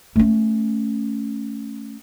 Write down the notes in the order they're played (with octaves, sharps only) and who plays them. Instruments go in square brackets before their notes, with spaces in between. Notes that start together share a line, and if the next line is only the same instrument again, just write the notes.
[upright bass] A3 C#4